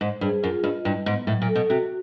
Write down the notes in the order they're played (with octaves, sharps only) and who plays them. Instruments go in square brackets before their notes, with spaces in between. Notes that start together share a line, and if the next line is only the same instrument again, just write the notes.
[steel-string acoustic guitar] G#2 [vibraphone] C5
[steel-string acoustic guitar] G2 [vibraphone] G#4
[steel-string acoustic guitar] F#2 [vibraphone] F4
[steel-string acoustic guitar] G2 [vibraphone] D#5
[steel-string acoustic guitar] G2 [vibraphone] E4
[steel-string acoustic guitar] G#2 [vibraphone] B3
[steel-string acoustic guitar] A2 [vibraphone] F#3
[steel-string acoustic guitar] A#2
[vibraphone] A4
[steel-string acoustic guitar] B2
[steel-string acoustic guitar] C3 [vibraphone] F#4